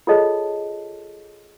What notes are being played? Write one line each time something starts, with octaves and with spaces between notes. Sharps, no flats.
F4 G#4 A4 C#5 D#5 A5